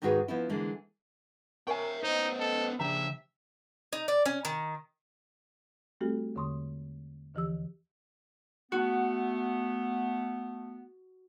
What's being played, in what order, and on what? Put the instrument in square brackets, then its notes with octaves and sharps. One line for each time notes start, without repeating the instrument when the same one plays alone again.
[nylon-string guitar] D#2 G#2 D#3 F#4 G#4 B4
F3 B3 C#4 E4
D3 E3 G#3 A#3
[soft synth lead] A#4 [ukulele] C#5 F5 G#5 [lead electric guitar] E5 G5
[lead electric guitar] B3 C5 [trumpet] D#4 [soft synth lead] D#5
[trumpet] A4
[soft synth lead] C#3 [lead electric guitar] F3 D5 [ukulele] D4 G4 A#5 [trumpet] E5
[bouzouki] D#4
D5
C#4
D#3
[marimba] G3 A3 C4 F#4 G4 A4
E2 D3 G#3 C6 C#6 D#6
D#2 D3 E3 F3 G4 E6
[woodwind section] A3 B3 [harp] F#4